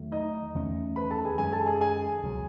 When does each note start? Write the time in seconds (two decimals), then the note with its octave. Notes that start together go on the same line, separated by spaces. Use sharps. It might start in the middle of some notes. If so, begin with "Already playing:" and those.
Already playing: E2 D#3 F#3 A3
0.12 D#4 D#5
0.55 E2 D#3 A3 C#4
0.96 B4 B5
1.11 A4 A5
1.25 G#4 G#5
1.38 F#2 D#3 G#3 G#4 G#5
1.52 A4 A5
1.66 G#4 G#5
1.81 G#4 G#5
2.23 C#2 B2 F#3